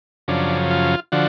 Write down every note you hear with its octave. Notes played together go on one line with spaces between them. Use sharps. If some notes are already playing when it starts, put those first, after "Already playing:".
F#2 C#3 F3 D4
F4
D3 F3 F#4